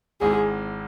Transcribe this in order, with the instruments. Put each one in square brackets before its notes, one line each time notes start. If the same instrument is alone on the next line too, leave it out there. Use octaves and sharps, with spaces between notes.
[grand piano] G#1 G#2 G#3 C4 E4 [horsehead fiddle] G#4